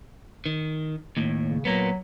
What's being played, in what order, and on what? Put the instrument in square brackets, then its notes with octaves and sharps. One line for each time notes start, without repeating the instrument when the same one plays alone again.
[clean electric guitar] D#3
D#2 A2
[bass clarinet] C#3
[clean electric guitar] A#2 A#3 B3 [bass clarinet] F#3